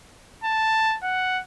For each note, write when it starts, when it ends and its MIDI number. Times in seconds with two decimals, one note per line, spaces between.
0.44 0.97 81
1.03 1.41 78